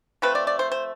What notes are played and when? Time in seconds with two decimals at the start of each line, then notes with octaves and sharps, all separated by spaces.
0.22 F3 A3 C4 B4
0.35 D5
0.47 D5
0.59 C5
0.72 C5